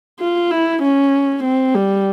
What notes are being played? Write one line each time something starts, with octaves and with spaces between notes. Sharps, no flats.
F4
E4
C#4
C4
G3